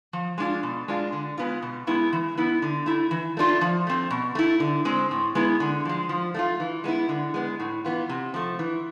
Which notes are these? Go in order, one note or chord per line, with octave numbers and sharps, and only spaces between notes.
F3
G#3 D4 F4
B2
G#3 D4 F4
D3
G#3 B3 F4
B2
G#3 B3 E4
E3
B3 E4
D3
A3 E4
E3
A3 D4 F4
F3
A3 C4
B2
A3 E4
D3
G#3 C4
A2
G#3 B3 E4
D3
F3 G#3
F3
A3 D4 F4
E3
G#3 B3 E4
D3
G#3 B3
A2
E3 B3 F4
C3
F3 A3
E3